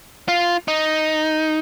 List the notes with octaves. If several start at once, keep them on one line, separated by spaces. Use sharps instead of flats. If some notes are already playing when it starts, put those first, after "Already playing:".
F4
D#4